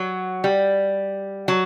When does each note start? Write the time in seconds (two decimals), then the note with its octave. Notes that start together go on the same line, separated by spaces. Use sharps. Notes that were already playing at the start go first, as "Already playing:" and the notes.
Already playing: F#3
0.44 G3
1.48 F#3